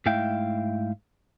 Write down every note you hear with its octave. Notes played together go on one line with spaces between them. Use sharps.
G#2 A3 E4 E5 F5 G5